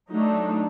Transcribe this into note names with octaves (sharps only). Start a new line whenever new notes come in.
F#3 A3 D4 D#4